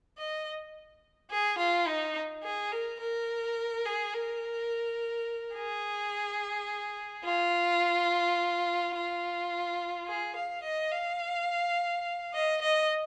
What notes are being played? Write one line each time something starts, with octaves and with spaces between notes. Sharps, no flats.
D#5
G#4
F4
D#4
G#4
A#4
A#4
G#4
A#4
G#4
F4
F4
G#4
F5
D#5
F5
D#5
D#5